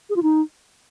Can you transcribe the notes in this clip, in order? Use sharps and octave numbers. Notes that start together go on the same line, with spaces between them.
G#4
F4
D#4